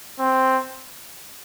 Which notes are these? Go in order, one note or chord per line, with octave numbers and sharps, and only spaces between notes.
C4